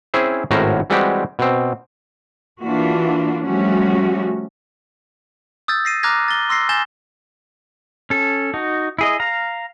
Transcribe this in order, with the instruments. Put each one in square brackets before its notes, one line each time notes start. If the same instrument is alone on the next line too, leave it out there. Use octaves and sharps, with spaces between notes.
[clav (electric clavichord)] C4 C#4 E4 G#4 C5
G#1 A2 C#4 F#4 A#4 C5
E3 G3 G#3 C4 F#4 G4
B2 C4
[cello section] E3 A#3 D4 F4 F#4
F3 G3 A3 C#4 F#4
[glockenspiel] D#6 E6 G6 A6
A#6 C7 D#7
A#5 D6 F6 F#6 G#6 A#6
A6 G7
C6 E6 A#6 C7
G#5 G6 A6 E7 G7
[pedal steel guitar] C#4 A4
D#4 F#4
E4 G#4 D#5
F5 A#5